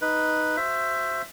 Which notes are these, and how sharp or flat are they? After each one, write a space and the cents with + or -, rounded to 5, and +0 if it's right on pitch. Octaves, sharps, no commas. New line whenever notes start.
D#4 +0 B4 +0
F#4 +0 C5 +0 E5 +15